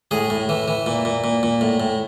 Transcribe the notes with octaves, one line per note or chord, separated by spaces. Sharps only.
A2 G#4
A2
E3
E3
A#2
A#2
A#2
A#2
A2
A2